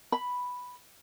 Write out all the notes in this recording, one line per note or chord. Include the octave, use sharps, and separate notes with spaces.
B5